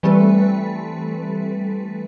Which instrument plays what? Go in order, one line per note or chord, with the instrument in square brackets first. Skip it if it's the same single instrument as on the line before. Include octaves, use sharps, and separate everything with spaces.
[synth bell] E3 G3 A3 C4 A4 B4